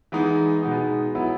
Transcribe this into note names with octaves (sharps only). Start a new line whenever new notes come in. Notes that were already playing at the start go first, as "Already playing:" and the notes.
E3 G#3 B3 D#4
B2 G#3 B3 D#4
F#3 B3 E4